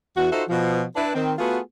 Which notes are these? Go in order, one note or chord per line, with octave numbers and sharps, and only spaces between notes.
E2 F#4
D#4 F4 F#4 A4 C5 E5
B2 F3
D4 E4 B4
D#3 C4
A3 B3 F4 F#4 G#4